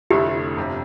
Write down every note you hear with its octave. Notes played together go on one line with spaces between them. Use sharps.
F1 F2 D3 A3 E4 G4
G1 F2 C3